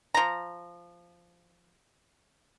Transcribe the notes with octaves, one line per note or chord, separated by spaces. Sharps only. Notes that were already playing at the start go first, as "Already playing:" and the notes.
F3 A#5